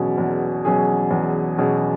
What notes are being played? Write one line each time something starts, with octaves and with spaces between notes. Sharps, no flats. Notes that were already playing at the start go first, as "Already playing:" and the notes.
Already playing: E2 B2 F#3 C#4 G#4
E2
B2 F#3 C#4 G#4
E2
B2 F#3 C#4 G#4